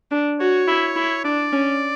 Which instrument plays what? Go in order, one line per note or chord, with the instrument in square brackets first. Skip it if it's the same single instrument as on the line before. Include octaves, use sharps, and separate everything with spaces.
[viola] D4
[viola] F#4 [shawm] C#5
[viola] E4
E4
[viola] D4 [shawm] D5
[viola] C#4